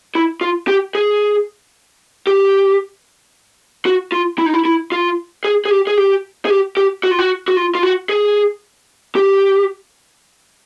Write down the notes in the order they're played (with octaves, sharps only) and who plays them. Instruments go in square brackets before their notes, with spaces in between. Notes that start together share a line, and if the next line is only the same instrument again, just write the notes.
[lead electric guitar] E4
F4
G4
G#4
G4
F#4
F4
E4
D#4
E4
E4
F4
G#4
G#4
G4
G#4
G4
G#4
G4
G4
F#4
F4
F#4
F#4
F4
F4
F#4
G#4
G4